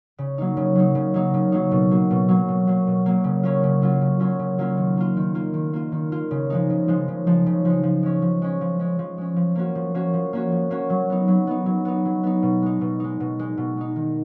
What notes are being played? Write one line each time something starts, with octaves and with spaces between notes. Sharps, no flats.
C#3
F#3 A#3 D#4
C#3
F#3 A#3 D#4
C#3
F#3 A#3 D#4
C#3
F#3 A#3 D#4
B2
F#3 A#3
B2
F#3 A#3
B2
F#3 A#3
B2
F#3 A#3
C#3
F#3 A#3 C#4 F4
C#3
F#3 A#3 C#4 F4
C#3
F#3 A#3 C#4 F4
C#3
F#3 A#3 C#4 F4
D#3
A#3 F4
D#3
A#3 F4
D#3
A#3 F4
D#3
A#3 F4
C#3
F3 G#3 D#4
C#3
F3 G#3 D#4
C#3
F3 G#3 D#4
C#3
F3 G#3 D#4
F3
G#3 C#4
F3
G#3 C#4
F3
G#3 C#4
F3
G#3 C#4
F3
A#3 C#4 F#4
F3
A#3 C#4 F#4
F3
A#3 C#4 F#4
F3
A#3 C#4 F#4
F#3
B3 D#4
F#3
B3 D#4
F#3
B3 D#4
F#3
B3 D#4
B2
G#3 D#4
B2
G#3 D#4
B2
G#3 D#4
B2
G#3 D#4
D#3